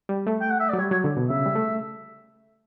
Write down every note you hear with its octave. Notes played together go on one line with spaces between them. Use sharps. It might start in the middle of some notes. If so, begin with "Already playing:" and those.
G3
A3
G5
F#5
E5
F#3 D5
G3 C#5
F#3 C#5
D3
B2
C#3 E5
G3
A3